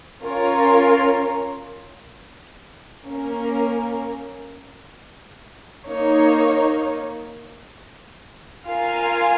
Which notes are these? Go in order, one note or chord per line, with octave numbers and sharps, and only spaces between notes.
C#4 F4 A#4 C#5
A#3 C#4 A#4
A#3 D#4 C#5
F4 A#4 F5 G#5